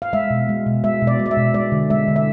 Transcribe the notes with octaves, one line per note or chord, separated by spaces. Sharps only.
F5
G#3 E5
B2
G#3
B2
G#3 E5
B2
D5
G#3
D5
E5
B2
G#3 D5
D3
G#3 E5
D3
E5